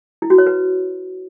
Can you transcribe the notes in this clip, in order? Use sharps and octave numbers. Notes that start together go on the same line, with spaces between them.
E4
F#4
C#5
B4